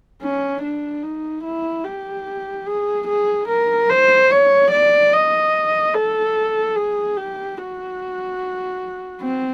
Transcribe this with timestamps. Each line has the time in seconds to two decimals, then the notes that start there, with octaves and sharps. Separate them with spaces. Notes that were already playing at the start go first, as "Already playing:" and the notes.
0.22 C#4
0.63 D4
1.03 D#4
1.44 E4
1.85 G4
2.67 G#4
3.08 G#4
3.49 A#4
3.90 C5
4.31 C#5
4.72 D5
5.13 D#5
5.94 A4
6.76 G#4
7.17 G4
7.58 F#4
9.22 C4